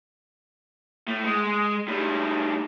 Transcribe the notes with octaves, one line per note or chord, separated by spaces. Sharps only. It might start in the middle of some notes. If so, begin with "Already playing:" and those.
A2
G#3
A2 G3